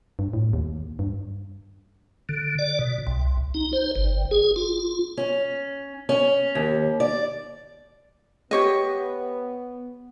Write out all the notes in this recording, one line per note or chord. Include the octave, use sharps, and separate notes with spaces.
G2
A2
D#2
G2
D3
D5
B2
C2
D#4
C5
G1
G#4
F4
C#4
C#4
D#2
D5
B3 G4 C#5 D#5